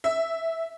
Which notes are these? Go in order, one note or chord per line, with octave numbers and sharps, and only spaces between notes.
E5